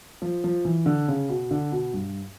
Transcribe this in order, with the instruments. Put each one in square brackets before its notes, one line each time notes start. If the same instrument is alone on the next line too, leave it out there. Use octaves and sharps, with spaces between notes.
[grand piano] F3
F3
E3
D3
C#3
B2
D3
B2
G2